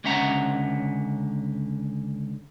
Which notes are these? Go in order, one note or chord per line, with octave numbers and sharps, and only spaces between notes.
C#2 D3 C#4 E5 F#5 A#5